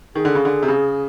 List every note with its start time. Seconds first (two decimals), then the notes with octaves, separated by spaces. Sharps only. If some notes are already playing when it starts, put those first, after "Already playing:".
0.15 D#3 G#4
0.25 D3
0.35 C#3
0.45 D3
0.63 C3
0.68 C#3